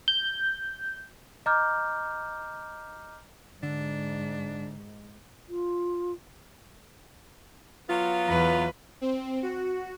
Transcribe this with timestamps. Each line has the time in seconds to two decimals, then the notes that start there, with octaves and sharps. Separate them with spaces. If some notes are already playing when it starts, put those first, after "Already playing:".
0.08 G6
1.46 D#5 A#5 D6 F6 G6
3.63 G#2 D3 D4
5.49 F4
7.89 F#3 B3 F4
8.27 E2 B4
9.01 C4
9.43 F#4